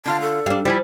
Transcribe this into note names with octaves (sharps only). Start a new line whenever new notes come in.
D3 F4 F5 A5
A4
G3 D4 F5
F3 G3 E4 G#5